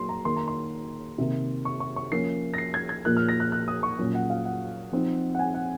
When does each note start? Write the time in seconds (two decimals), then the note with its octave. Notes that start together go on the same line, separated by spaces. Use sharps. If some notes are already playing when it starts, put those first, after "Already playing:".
Already playing: A#2 F#3 A#3 C6
0.09 A#5
0.25 D#3 A#3 D#4 C6
0.36 A#5
0.48 C6
1.18 C3 D#3 A#3
1.65 C#6
1.80 C#6
1.96 C#6
2.12 F3 A#3 C#4 C7
2.54 A#6
2.58 C7
2.74 G#6
2.89 G#6
3.05 A#2 F3 A#3 F#6
3.17 F6
3.29 A#6
3.40 F#6
3.52 F#6
3.68 D#6
3.83 C#6
3.99 A#2 F#3 C#4
4.15 F#5
4.30 F5
4.45 F#5
4.92 F3 C4 D#4
5.35 F#5
5.39 G#5
5.54 F#5